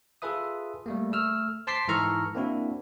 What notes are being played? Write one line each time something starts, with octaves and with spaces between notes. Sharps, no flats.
F4 G#4 A4 B4 E5 D#6
G3 A3 A#3
A3 E6 F6
C5 A5 C6 D6 B6 C7
G#2 E3 A4 A#5 C#6 F6
A#3 C4 D4 E4 F#4